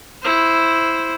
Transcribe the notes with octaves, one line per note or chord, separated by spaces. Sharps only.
E4 C5